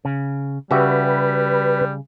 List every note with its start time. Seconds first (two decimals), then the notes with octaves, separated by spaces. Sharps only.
0.05 C#3
0.71 C#3 G3 F#4 G4 B4 E5